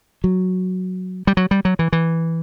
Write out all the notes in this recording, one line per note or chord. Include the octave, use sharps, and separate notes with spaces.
F#3
G3
F#3
G3
F#3
E3
E3